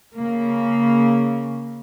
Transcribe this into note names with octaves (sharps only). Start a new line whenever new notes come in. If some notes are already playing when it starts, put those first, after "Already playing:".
C#3 A#3